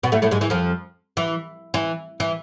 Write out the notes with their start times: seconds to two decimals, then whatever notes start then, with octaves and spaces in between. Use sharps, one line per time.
0.03 B2 B3
0.12 A2 A3
0.22 A2 A3
0.31 G#2 G#3
0.41 E3
0.50 F2 F3
1.17 E3
1.74 E3
2.20 E3